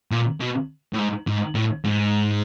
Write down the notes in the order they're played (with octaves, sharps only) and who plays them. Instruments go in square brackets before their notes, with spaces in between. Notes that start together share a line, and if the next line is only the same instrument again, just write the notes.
[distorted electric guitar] A#2
B2
A2
G#2
G#2
A2
G#2